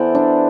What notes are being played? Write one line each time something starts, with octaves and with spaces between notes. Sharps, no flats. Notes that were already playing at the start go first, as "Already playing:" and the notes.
Already playing: E3 B3 A4 C5 D5
D4